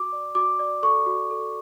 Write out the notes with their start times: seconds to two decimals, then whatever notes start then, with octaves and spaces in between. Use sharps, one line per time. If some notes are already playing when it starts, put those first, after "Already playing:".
Already playing: F#4 D6
0.12 D5
0.35 F#4 D6
0.59 D5
0.83 A4 C#6
1.06 F#4
1.31 A4